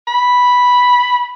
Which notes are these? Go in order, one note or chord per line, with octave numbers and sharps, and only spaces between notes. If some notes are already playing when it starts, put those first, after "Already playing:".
B5